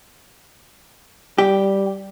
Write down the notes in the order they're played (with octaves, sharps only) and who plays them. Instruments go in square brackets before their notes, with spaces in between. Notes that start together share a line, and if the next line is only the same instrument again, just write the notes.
[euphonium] G3 [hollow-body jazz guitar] G4